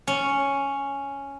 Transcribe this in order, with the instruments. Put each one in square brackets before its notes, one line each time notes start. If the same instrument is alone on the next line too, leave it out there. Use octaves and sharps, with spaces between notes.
[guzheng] C#4